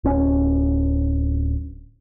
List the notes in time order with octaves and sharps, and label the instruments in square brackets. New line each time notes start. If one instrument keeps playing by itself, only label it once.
[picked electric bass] D1 C#4